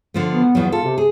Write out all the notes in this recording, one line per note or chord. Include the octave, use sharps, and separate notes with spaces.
D3 F3 A3
B3
E2 F3 F#3
F4 A4
C3
G#4